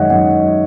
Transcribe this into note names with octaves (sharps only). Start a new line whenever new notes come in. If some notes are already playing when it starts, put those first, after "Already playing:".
Already playing: F#2 D#3 G#3 C#5 D#5 E5 F#5
F#2 F#5